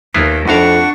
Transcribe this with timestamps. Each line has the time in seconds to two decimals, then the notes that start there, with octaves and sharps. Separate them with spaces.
0.14 D#2 B3 E4 F4
0.48 F2 A2 D4 F#4 F5 F#5 C#6